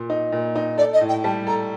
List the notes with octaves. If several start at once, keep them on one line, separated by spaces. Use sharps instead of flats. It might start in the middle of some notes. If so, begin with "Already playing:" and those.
Already playing: A#2
D#4
A#2
D#4
A4 D5
D#5
A2
G5
G3 A5
A4 A#5